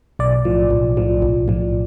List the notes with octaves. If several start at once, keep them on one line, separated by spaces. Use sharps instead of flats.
B1 D5
A2 F3
B1
A2 F3
B1
A2 F3